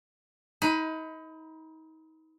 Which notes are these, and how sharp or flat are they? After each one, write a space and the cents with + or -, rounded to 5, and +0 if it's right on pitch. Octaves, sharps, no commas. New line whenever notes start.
D#4 +35 B4 +20